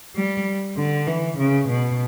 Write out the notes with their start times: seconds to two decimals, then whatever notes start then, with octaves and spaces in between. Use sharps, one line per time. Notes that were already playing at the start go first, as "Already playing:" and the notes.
0.16 G3
0.77 D3
1.07 E3
1.38 C#3
1.69 B2